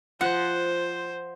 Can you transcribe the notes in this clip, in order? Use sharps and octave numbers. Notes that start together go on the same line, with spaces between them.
F3 C5 F#5